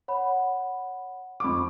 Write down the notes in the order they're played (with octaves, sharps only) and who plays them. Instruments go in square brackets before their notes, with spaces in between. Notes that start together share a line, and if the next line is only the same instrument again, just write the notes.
[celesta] C#5 F#5 B5
[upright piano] F2 D6 [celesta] B5 C#6